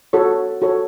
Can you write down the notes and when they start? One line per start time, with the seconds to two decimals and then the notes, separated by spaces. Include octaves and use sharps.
0.13 F#4 A4 C#5
0.62 F#4 A4 C#5